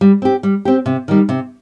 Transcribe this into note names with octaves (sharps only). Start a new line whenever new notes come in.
G3
C4 G4
G3
C4 G4
C3
D#3 G3
C3